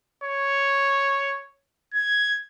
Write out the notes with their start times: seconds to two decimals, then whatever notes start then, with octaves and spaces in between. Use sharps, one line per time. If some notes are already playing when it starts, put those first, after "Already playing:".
0.24 C#5
1.94 G#6